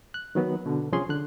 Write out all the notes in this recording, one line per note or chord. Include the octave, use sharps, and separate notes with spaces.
F#6
D#3 F#3 B3
B2 D3
C2 F3 C#4 G#4 C6
D3 F#6